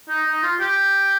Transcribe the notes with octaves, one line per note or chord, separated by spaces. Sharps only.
D#4
D#4
F4
G4